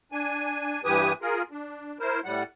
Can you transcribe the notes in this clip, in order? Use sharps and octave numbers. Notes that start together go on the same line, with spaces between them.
D4 G#5
G2 E3 G4 B4 G#5 D#6
F4 G#4 A#4
D4
E4 A#4 C5
A2 G3 F#5